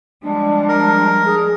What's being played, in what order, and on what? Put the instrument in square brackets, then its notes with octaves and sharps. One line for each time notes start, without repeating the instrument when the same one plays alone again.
[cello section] F3 G3 G#3 [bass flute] D4
[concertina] A#4
[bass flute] G#4